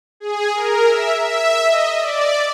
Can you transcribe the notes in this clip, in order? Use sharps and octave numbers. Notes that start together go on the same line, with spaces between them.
G#4
A#4
E5
E5
D#5
D5